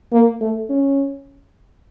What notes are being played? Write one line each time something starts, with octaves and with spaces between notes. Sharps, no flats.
A#3
A3
C#4